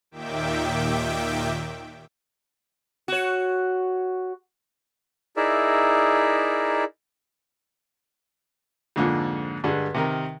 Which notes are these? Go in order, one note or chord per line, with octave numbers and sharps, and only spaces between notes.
D#2 A#2 D#3 E5 G5 D6
F#4 C#5
D#4 E4 G#4 A#4 D5 E5
F2 G#2 D3 F3 A#3
G2 D3 G3 G#3
C3 D#3 A#4